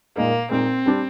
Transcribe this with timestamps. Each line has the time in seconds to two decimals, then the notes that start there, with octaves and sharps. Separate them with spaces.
0.16 A#2 G#3 A#3 D#4 A#4
0.51 A#2 G#3 C4 D#4 A#4
0.86 G3 D4